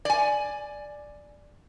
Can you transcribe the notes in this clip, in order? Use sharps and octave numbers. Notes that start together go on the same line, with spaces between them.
D5 G#5